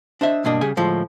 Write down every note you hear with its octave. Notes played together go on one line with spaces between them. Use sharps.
D4 C5 D#5 E5
G2 B2 A#3 D4 D#5
C#3 G3 G#4 G#5
D2 A2 F3 G#3